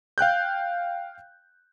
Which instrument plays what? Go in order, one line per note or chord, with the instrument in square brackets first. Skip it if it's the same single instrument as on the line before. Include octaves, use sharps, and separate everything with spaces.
[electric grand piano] F5 G5 F#6 G6